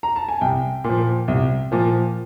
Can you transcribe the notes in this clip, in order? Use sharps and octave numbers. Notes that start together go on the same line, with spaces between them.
A#5
A5
G#5
C2 G5
A#2 F3
C2
A#2 F3